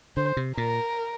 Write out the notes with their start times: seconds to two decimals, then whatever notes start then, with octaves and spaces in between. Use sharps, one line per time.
0.17 D3 C5
0.37 C3
0.57 A#2 A#4